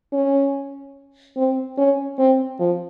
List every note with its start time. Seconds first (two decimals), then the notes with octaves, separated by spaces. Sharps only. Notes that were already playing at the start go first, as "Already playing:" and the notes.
0.13 C#4
1.37 C4
1.78 C#4
2.18 C4
2.59 F3